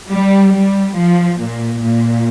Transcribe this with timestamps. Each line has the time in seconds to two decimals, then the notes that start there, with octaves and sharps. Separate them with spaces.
0.11 G3
0.54 G3
0.97 F3
1.40 A#2
1.84 A#2